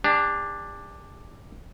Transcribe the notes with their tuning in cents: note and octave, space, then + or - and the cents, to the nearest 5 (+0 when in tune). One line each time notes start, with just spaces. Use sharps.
D4 +0 G4 +45